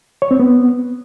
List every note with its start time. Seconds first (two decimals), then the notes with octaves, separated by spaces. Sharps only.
0.22 C#5
0.31 C4
0.40 B3